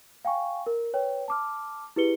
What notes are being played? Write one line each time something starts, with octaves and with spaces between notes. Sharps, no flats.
F5 G5 G#5 C#6
A#4
B4 C#5 G5
A5 D6 F6
E4 G4 G#4 B4 C#7 G7